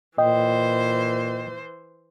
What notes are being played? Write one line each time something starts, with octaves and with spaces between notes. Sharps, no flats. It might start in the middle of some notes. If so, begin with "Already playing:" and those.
A#2 E3 C5 D#5 G5